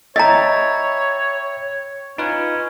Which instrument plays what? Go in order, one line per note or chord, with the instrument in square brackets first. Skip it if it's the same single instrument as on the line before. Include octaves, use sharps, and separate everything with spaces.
[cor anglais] C#5 [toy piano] D#5 A#5 [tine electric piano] E5 G5 B5
[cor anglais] C#4 [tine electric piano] D#4 F4 B4